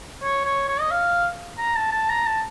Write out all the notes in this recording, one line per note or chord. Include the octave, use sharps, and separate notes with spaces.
C#5
C#5
C#5
D#5
F5
A#5
A5
A5
A#5
A5